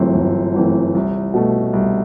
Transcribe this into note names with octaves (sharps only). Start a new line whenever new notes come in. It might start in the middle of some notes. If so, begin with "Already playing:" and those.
Already playing: G1 F#2 E3 A3 C4
G1
F#2 E3 A3 C4
C2
B2 A3
C2